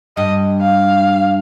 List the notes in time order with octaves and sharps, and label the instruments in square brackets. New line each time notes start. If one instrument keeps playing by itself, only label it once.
[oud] G2 [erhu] D#5
[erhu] F5